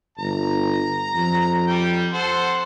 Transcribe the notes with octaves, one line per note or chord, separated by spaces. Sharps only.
G1 A#5
F2
G3 G5
A4 C5 F#5